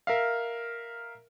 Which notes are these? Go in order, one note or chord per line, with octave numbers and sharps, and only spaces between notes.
A#4 E5 F5